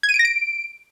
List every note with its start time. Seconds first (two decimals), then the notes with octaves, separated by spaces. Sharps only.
0.03 G#6
0.09 D#7
0.14 D7
0.19 A#6
0.25 D7